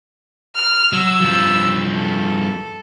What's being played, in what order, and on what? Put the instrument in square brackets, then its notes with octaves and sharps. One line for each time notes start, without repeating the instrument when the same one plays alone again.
[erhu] F6
[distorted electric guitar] F#3 [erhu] E6
[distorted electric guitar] G2 F3
[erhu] A4